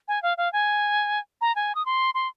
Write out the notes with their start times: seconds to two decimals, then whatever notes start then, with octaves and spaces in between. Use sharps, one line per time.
0.08 G#5
0.22 F5
0.37 F5
0.53 G#5
1.41 A#5
1.56 G#5
1.75 D#6
1.86 C6
2.14 C6